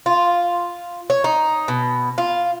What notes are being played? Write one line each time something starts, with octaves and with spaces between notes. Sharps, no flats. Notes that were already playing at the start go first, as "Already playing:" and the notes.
F4
C#5
D#4
B2
F4